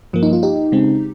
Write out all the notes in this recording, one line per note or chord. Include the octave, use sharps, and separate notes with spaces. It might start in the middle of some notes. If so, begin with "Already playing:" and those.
G2 F3 A#3
D#4
F4
D#4 G4
C#3 G#3 C4